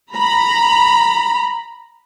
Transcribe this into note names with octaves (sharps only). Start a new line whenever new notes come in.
A#5 B5